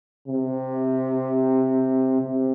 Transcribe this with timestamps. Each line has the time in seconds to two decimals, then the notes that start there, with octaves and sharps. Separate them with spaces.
0.28 C3
2.21 C3